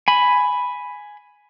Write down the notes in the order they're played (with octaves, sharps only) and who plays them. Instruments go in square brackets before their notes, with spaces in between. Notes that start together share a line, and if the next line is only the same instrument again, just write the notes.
[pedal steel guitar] G#5 B5